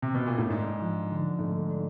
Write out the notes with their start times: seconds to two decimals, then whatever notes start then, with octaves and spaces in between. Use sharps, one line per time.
0.02 C3
0.15 B2
0.26 A#2
0.38 A2
0.49 G#2 D4
0.80 F3
1.10 D3
1.39 G#2 A3
1.69 D4